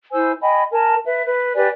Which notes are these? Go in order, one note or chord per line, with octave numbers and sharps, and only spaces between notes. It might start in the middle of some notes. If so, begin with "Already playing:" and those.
E4 C5 G#5 E6
D#5 G5 G#5 B5
A#4 G#5 A5
B4 E5
B4
G4 B4 D5 G#5